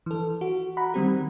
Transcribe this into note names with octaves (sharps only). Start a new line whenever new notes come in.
E3 A4
F#4
F#5 A#5 B5
D#3 G3 C4 G4